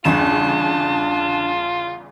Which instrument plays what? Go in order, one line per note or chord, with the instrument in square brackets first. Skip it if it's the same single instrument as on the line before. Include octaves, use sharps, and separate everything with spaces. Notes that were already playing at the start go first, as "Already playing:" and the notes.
[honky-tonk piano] G1 E2 C#3 [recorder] D4 [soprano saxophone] F4 [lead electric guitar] A5